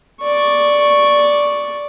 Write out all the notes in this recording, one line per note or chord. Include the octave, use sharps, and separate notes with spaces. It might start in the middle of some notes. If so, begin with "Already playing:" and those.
D5 C#6